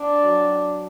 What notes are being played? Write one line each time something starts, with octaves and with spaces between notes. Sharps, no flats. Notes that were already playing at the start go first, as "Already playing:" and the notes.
Already playing: D4
F#3